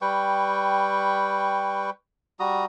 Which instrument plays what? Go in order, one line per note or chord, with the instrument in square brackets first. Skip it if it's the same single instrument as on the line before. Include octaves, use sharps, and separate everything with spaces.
[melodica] G3 B4 G5 C#6
G3 F#4 A#5 D#6